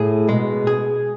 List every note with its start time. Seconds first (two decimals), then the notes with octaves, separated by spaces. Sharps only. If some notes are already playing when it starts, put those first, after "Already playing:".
Already playing: A2 G#4
0.29 B2 G#3
0.67 G#4